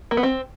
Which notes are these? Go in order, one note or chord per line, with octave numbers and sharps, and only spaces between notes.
A#3
B3
C4